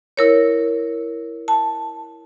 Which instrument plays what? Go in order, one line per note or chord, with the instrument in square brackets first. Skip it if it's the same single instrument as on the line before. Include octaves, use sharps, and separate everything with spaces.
[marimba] E4 A#4 C#5
A5